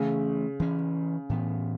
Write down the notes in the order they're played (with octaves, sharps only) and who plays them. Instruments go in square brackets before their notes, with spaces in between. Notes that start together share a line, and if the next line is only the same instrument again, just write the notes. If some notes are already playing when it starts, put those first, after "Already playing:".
Already playing: [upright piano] C#3 [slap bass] E3 A3 C#4
[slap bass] E3 C#4
A2 E3 B3